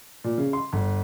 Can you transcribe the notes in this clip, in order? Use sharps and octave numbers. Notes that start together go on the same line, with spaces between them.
A#2
C#3
C6
G1